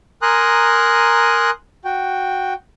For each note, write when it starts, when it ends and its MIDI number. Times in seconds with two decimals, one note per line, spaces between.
0.22 1.50 70
0.22 1.50 80
0.22 1.50 82
0.22 1.50 84
0.22 1.50 87
0.22 1.50 90
1.85 2.54 66
1.85 2.54 79